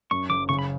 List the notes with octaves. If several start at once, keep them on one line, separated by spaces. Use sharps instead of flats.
F#2 C#6
F#1 D6
C#3 C#6
B5